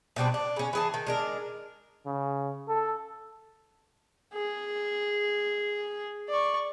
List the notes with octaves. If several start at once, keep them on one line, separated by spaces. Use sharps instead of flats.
B2 G3 C4 D4
D4
C#3 C#4
E3 G#4 A5
D#3
G#3 D4 A#4
C#3
A4
G#4
D5 C#6